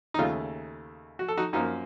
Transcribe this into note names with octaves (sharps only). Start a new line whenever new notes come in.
D#4
D#2 C#3 A3 F4
F#4
A4
D#4 F#4
F#2 F3 A#3 D#4